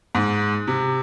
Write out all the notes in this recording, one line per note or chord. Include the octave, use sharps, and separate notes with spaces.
G#2
C3